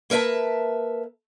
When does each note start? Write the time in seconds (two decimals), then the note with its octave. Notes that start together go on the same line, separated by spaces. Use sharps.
0.10 A#3 A#4 B4 E5 A5